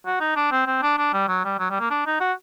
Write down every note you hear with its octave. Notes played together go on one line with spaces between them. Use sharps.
F#4
D#4
D4
C4
C4
D4
D4
G3
F#3
G3
F#3
G3
A#3
D4
D#4
F#4